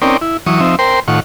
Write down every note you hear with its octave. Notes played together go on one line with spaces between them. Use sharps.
C4 C#4 D#4 A#4 D5 G5
E4
E3 F#3 C#6 D#6
F3 C4 D#4 E5
A#4 C5 G5 C6
A2 D#3 F4 F#5 C#6